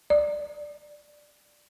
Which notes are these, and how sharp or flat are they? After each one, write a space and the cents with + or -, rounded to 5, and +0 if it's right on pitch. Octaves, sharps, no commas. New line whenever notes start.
D5 +5